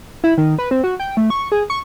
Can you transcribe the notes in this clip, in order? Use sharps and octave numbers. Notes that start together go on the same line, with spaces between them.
E4
D#3
B4
C4
F#4
G5
A3
C#6
G#4
C#6